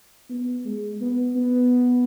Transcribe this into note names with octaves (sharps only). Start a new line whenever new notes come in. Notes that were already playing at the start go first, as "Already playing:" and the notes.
B3
G#3
B3
B3